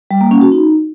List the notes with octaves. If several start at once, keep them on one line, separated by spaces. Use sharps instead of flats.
G3
A#3
C#4
F#4
D#4